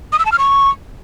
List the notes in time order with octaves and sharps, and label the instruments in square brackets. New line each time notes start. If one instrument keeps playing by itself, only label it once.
[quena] D#6
E6
A5
F6
C#6